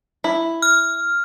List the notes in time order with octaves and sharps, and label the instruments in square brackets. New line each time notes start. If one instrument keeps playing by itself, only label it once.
[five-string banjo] E4
[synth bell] F6